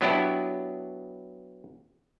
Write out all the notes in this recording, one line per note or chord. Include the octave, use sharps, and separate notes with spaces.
B2 F#3 B3 D4 E4 G4